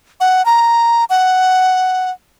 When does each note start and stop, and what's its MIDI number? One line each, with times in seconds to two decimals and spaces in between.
0.20 0.45 78
0.46 1.05 82
1.10 2.11 78